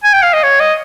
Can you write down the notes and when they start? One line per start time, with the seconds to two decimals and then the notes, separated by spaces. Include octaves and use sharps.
0.04 G#5
0.13 G5
0.23 F5
0.34 D#5
0.43 C#5
0.60 D#5